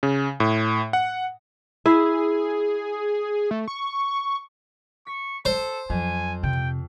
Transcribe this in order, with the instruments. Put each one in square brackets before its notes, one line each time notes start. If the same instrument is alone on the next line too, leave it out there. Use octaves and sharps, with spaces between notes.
[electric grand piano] C#3
A2
F#5
[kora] E4 [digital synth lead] G#4
[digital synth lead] A3
C#6
[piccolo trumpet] C#6 [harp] B6
[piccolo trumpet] A4 [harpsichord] C5
[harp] F2 [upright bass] F#3 [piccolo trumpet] G#5
[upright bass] C3 [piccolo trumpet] G5